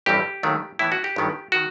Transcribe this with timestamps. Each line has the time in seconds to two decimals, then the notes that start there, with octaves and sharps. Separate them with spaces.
0.06 A1 G2 E3 G3 C4 G4
0.43 D#2 D#3 F#3 A3
0.79 A2 E3 B3 E4
0.92 F#4
1.04 G4
1.16 G1 G2 D#3 F#3 B3
1.52 D#3 F#4